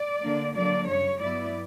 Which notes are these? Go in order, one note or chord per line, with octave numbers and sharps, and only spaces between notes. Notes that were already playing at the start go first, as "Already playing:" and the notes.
Already playing: D5
D3 A#3 D4
D3 F#3 A#3 D4 D5
F#2 C#3 G3 C#5
G2 F#3 B3 E4 D5